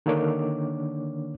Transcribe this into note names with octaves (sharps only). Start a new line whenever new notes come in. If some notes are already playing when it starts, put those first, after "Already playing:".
D3 D#3 A#3 D4 C#5 D6